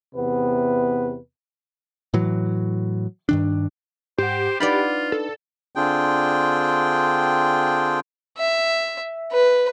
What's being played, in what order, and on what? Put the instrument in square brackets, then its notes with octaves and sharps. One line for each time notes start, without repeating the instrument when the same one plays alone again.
[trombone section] E2 C3 B3 B4
[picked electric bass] A2 E3 F#3
G2 D#3 D4
[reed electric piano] G#2 F#5 [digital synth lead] G4 [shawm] C5
[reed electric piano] D4 D#4 B4 [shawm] F4 [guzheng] D5 F#5 B5
[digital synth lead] A4
[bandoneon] D3 C4 D4 F4 G#4 G5
[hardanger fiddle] E5
B4